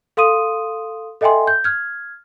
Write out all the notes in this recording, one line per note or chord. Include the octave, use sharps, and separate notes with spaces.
A4 F5 C6 D#6 D#7
A4 D#5 E5 G5 G#5 C6
G6
F6 G#6